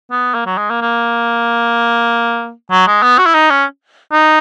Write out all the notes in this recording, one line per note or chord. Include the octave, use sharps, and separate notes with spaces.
B3
A#3
F#3
G#3
A#3
A#3
F#3
G#3
B3
F#4
E4
D#4
C#4
D#4